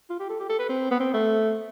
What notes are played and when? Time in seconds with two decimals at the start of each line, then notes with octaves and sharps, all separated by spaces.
0.10 F4
0.20 G4
0.30 A4
0.40 G4
0.49 A4
0.59 B4
0.69 C4
0.91 B3
1.00 C4
1.14 A3